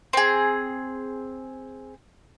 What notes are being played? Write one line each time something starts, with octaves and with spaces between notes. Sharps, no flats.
C4 G#4